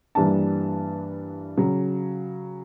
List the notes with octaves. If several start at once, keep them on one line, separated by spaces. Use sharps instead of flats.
G2 E3 G3 A#3 D4 A5
C#3 F#3